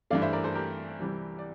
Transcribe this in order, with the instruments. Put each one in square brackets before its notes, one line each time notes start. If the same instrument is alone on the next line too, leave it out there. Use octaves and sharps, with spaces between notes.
[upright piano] G2 E3 A3 D5 F5
C5 E5
A#4 D5
A4 C5
G4 A#4
C2 C3 E3 G3
D5